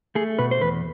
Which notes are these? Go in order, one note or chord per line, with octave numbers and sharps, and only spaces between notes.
A3 G#4
B2 B4
C5
E2 B4